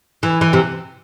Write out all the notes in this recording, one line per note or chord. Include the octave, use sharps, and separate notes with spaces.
E3
E3
C3